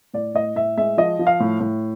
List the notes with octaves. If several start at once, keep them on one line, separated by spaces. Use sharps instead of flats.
A2 D5
A2 D#5
A2 E5
G#3 E5
F3 D#5
F3
F5
A2
A2